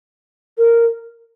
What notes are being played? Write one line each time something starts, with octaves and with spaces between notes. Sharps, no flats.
A#4